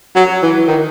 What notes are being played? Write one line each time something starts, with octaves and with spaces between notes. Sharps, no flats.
F#3
E3
D#3